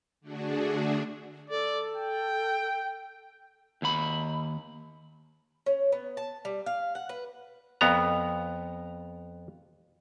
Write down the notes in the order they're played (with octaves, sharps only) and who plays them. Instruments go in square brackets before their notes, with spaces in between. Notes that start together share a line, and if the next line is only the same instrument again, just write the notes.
[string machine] D3 A3 D4 F#4 G#4
[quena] A4 [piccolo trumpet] D5
[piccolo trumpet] G5
[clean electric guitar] D#2 B5
[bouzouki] C#4
B3
A5
G3
F5
F#5
B4
[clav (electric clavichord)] F2 B3 A#5